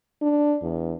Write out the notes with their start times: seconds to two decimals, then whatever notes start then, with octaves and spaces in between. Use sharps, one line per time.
0.22 D4
0.63 E2